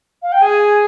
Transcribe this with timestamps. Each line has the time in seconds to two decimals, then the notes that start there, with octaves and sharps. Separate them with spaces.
0.23 F5
0.32 G5
0.42 G#4 G#5